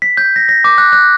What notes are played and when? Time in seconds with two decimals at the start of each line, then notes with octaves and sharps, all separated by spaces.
0.02 B6
0.17 G6
0.36 A#6
0.49 A#6
0.64 D6
0.78 F#6
0.93 F#6